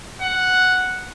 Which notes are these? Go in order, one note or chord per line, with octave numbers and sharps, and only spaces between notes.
F#5